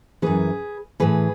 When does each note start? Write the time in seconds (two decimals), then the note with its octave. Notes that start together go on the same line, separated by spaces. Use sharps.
0.22 F#2 E3 G#4 B4
1.00 A2 E3 G#4 B4